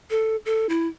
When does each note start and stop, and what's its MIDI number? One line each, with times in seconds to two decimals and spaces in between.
0.10 0.36 69
0.46 0.67 69
0.69 0.87 64